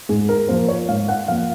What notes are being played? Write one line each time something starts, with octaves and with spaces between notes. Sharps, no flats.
G#2 G#4
A#4
F3 A#3 C5
C#5
G#2 F5
F#5
F3 A#3 F5